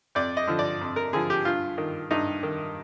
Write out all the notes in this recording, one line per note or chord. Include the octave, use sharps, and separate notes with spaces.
F2 D5
D#5
D3 F3
D5
F2
A#4
D3 F3 G#4
G4
G2 F4
D#3
G2 D#4
D#3